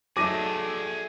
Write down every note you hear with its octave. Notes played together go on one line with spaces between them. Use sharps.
F#3 A3 D#4 G#4 E5 D6 A#6 D#7